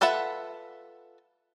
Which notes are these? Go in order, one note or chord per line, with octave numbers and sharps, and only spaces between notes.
F4 A4 B4 E5 F#5